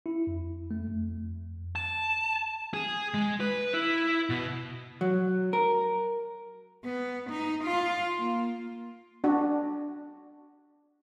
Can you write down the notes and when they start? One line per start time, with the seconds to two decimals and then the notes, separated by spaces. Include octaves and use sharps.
0.06 E4
0.27 F2
0.71 A3
0.88 F2
1.76 A5
2.74 G#4
3.14 G#3
3.40 B4
3.74 E4
4.30 B2
5.01 F#3
5.53 A#4
6.84 B3
7.30 D#4
7.64 F4
8.19 A#3
9.24 D4 F#4